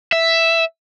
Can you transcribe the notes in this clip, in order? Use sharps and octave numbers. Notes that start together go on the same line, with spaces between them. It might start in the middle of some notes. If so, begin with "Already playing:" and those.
E5